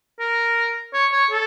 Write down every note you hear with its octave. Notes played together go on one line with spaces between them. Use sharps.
A#4
C#5
C#5
A4